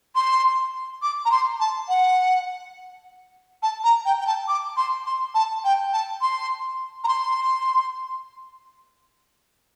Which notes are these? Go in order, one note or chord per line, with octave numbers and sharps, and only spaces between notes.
C6
D6
A#5
C6
A5
F#5
A5
A#5
G5
G5
A5
D6
C6
C6
A5
G5
A5
C6
A#5
C6